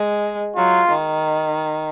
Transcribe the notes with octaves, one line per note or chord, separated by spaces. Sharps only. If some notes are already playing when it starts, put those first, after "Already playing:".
Already playing: G#3
F#3 F4
D#3